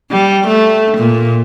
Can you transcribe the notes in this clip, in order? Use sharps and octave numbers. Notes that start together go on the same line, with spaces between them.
G3
A3
A#2